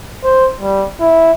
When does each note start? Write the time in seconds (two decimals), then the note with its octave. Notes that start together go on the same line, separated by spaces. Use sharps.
0.24 C5
0.61 G3
1.01 E4